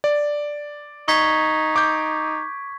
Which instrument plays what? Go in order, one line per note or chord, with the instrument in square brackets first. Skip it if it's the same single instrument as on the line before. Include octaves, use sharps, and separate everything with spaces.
[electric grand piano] D5
[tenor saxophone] D#4 [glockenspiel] C#6 G#6 B6
[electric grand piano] D6 G6